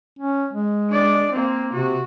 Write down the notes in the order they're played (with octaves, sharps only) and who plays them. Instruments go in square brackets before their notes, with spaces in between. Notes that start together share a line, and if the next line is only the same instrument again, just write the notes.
[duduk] C#4
G#3
[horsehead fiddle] D4 D5
A#3 C4
[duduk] C3 [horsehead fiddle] F#4